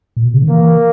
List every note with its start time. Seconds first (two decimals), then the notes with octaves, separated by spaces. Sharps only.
0.17 A#2
0.26 B2
0.33 C#3
0.42 D#3
0.50 E3 A#3